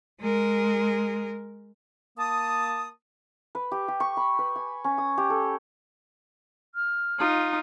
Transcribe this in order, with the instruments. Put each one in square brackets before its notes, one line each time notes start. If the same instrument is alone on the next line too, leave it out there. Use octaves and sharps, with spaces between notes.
[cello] G#3 A#4
[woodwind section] A#3 A5 D#6
[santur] B4
G4
G4
C#6
B5
B4
G#5
C#4
D#6
G4
A4
[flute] F6
[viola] D#4 F4